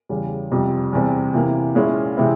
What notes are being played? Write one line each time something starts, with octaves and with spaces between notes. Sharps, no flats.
E2 C#3 G3
F2 C3 G3
E2 C3 G3 C4
C3 E3 A#3
A#2 G#3 C#4 E4
C3 E3 G#3 C4 E4